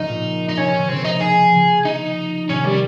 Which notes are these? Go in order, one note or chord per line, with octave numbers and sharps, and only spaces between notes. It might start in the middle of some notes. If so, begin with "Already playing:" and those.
Already playing: C#3 F3 A#3 D#4
A#2
D#4
C3 C#4
C3
C3 D#3
C#3 F3 C4
D#4
G#4
C#3 F3
D#4
C3 D#3 C#4
G3